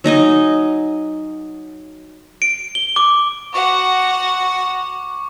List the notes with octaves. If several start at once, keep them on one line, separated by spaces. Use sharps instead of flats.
F#3 D#4 D#5 G#5
D7
G7
D6
F#4 F#5 C#6 D6